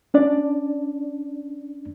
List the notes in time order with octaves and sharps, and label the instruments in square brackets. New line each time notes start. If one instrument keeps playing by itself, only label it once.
[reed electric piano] C#4 D4 D5